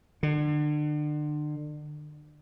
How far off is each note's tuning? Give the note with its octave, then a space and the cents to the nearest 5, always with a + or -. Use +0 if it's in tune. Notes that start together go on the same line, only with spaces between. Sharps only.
D3 +35